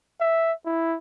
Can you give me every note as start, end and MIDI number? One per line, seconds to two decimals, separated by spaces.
0.20 0.53 76
0.66 0.98 64